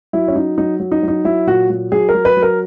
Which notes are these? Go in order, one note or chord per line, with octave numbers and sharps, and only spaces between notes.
F#3 E4
C#4
F#3 D#4
F#3 D#4
F#3
D#4
F#3
D#4
F#3 E4
A#2 F#4
F#3
F#3 G#4
A#4
F#3
B4
F#3
A#4